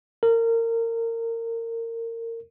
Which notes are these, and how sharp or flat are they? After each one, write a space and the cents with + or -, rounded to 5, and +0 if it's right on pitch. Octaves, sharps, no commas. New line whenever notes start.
A#4 -25